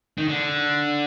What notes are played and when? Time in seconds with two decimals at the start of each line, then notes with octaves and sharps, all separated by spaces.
0.17 D#3
0.28 D3